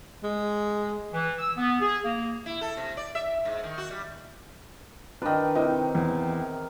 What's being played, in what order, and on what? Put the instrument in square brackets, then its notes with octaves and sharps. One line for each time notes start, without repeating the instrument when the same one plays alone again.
[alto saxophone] G#3
[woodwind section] E3
E6
B3
G#4
A#3
[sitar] E4
A4
C3
D5
E5
G#2
D#3
F#4
G3
[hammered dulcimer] D#3 B4 [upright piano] D4 D#5
[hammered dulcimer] C3 [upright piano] D#4 E4 D#5
[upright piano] E2